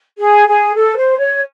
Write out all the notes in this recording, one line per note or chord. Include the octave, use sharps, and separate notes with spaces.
G#4
G#4
A4
C5
C#5